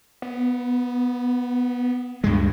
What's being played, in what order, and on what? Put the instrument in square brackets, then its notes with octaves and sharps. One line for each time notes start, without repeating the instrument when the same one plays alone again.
[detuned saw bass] B3
[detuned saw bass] D2 [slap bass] G2 G#3